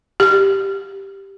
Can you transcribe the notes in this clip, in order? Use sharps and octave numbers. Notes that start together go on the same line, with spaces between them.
G4